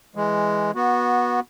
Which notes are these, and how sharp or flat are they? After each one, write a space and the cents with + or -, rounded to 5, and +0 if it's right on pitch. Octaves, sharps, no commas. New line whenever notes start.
E3 +0 G#3 +0
B3 -20 F#4 -10